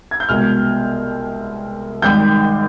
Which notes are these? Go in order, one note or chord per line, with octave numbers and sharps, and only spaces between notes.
G#6
G6
C2 B2 G#3 F6
G#1 G#2 D#3 G3 G6